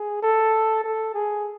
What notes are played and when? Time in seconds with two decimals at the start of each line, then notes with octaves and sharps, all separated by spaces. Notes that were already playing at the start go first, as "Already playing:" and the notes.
Already playing: G#4
0.22 A4
0.84 A4
1.14 G#4